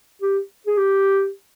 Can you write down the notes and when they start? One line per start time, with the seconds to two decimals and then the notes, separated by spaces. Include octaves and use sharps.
0.21 G4
0.67 G#4
0.77 G4